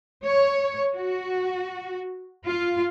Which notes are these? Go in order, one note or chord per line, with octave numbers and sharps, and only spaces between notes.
C#5
F#4
F4